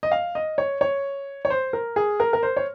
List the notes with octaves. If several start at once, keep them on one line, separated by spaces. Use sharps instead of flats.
D#5
F5
D#5
C#5
C#5
C#5
C5
A#4
G#4
A#4
A#4
C5
C#5